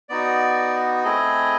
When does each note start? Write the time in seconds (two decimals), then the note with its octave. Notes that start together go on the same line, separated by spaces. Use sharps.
0.09 B3 D#4 F#4 D5
1.04 A3 C4 E4 G#4 D#5